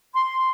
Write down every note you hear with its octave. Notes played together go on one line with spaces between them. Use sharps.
C6